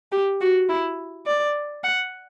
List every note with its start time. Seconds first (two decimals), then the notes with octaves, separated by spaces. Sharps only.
0.12 G4
0.41 F#4
0.69 E4
1.26 D5
1.84 F#5